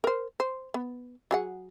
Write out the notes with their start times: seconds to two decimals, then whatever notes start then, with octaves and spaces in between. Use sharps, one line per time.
0.04 A#4 C5
0.40 C5
0.74 B3
1.31 F#3 G#4 F#5